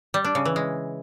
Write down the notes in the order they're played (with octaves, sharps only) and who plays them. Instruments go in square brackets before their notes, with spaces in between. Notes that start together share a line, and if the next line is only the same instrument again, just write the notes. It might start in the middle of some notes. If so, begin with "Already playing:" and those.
[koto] G3
D4
C#3
E3
G#3